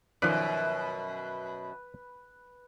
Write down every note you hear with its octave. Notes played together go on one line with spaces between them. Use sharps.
F#2 B2 D#3 F3 B4 D5